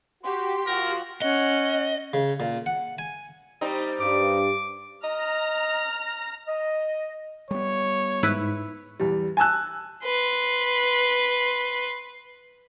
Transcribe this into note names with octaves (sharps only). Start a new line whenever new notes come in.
F#4 G4 C6
F3 F4 F#4 A#4
C#4 D#5 F#5
C#3
A#2
F#5
G#5
G3 C4 D#4
G2 D6
D#5 A#5 F6 A#6
D#5
G3 B3 C#5
G#2 E4 B4
E2 G3
G#5 A5 E6 F#6
B4 C6